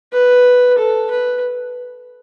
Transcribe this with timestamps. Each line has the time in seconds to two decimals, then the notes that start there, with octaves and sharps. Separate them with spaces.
0.13 B4
0.78 A4
1.11 B4